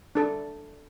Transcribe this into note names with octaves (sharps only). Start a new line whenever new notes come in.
D4 A4